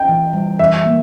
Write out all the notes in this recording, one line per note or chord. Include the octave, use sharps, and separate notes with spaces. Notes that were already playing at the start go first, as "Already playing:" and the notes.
Already playing: G5
E3
G3
E3 E5
A#3